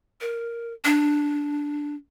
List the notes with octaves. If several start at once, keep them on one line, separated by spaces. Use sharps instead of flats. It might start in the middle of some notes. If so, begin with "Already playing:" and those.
A#4
D4